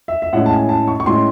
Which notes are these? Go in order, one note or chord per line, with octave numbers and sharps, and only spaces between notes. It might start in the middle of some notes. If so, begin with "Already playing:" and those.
E5
E5
A2 G#3 C#4 E4 F#5
A5
G#5
A5
C#6
C#6
A2 G#3 C#4 E4 C6